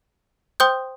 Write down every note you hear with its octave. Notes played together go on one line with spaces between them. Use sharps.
C5 G5 C6 D#6 G6